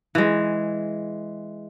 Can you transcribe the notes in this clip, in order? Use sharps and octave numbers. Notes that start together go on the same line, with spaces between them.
E3 G#3